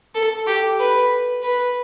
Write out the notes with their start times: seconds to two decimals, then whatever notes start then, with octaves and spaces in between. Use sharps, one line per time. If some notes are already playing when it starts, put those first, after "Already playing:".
0.15 A4
0.46 G4
0.79 B4
1.43 B4